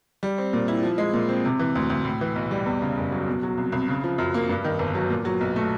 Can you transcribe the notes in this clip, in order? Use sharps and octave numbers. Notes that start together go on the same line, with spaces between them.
G3
C4
A#2
E4
F3
G#3
A#2
C4
C3
E3
D2
D2
A2
E3
B1
G3
E2
C#3
F#1
F#3
B2
F#3
C2
C2
C#3
F3
F#2
A#3
G2
D#3
G1
F#3
A#2
F#3
B1
A3